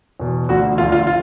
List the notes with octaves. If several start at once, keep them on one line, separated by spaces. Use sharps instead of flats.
E2 B2
D2 D3 F3 F#4
D2 D3 F3 F4
F4
F4